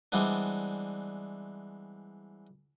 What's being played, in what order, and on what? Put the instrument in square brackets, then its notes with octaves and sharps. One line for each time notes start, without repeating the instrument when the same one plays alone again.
[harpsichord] E3 G3 G#3 B3 C4 D4